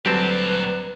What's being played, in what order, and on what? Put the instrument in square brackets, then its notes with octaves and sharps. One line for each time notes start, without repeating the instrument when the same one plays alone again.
[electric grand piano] D2 F#3 G3 [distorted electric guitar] A#2 A5 [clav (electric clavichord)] C4 G4 [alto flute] B4